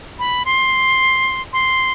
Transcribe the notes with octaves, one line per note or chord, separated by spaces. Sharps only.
B5
C6
C6